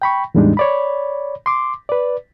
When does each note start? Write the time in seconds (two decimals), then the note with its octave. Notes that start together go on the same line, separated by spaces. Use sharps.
0.02 G5 B5 C#6
0.35 E2 A2 G3 G#3 D4 D#4
0.57 C#5 D5 B5
1.46 C6 D6
1.89 B4 D5